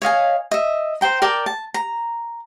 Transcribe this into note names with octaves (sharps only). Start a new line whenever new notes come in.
C#5 D#5 F5 G#5
D#5 E5
C5 G5 A#5
A#4 D5 G5 A5
A5
A#5